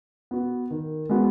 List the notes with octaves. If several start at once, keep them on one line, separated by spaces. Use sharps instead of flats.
B3 F#4
D#3
G#3 B3 F#4